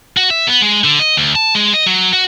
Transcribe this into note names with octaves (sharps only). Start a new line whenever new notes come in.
F#4
E5
B3
G#3
D3
D#5
D2
A5
G#3
D#5
F#3
F#4